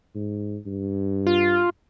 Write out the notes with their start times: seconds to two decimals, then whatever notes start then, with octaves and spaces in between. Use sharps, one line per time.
0.15 G#2
0.66 G2
1.27 F4